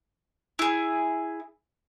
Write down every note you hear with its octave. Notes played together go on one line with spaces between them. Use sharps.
E4 G#4